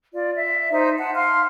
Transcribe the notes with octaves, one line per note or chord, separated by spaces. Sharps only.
F4 D5
E5
D#4 C5 E5
F#5 A5
F5 C6 F6